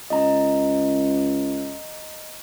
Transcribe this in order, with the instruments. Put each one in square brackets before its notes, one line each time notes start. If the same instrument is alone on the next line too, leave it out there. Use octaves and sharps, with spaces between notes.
[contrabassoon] C#2 [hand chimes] D#5 A#5